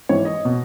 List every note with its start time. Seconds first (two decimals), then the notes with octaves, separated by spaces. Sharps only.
0.09 G#2 E3 C#5
0.25 D#5
0.45 B2